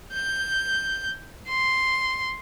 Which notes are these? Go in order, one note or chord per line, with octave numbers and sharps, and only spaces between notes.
G6
C6